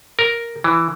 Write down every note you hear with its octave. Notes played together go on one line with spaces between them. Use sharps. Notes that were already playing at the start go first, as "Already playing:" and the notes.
A#4
E3